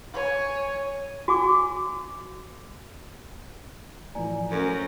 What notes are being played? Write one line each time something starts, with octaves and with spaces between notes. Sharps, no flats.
C#5 G#5
F#4 G#5 D6
A2 E3 F3 D5 G#5 A#5
F#2 F#3 C#4 A4 A#4 C5